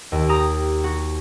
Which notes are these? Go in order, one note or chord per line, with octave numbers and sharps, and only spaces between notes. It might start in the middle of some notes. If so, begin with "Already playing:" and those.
D#2
G4 A#5 D#6
F#4